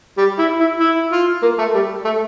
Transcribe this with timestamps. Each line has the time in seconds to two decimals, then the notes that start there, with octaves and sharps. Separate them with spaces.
0.18 G3
0.39 E4
0.60 E4
0.80 E4
1.12 F4
1.42 A#3
1.59 A3
1.74 G3
2.05 A3